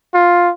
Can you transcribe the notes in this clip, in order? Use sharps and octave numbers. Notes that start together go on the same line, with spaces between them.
F4